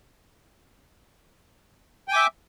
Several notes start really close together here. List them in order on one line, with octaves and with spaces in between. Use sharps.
G5 G#5 D6 E5